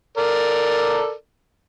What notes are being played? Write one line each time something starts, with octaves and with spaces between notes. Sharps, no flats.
A4 A#4 D5